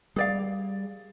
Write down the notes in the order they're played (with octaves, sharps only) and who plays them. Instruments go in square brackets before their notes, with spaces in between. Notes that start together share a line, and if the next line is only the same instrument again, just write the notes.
[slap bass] G3 [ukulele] G#4 D5 F5